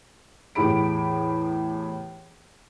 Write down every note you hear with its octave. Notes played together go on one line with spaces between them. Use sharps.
E2 A2 G4 G#4 B5 D7